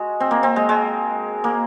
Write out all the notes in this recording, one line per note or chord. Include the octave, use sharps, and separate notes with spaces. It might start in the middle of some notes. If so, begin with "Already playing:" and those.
Already playing: G#3 F#4
C4
A#3
C4
G#3
G#3
A#3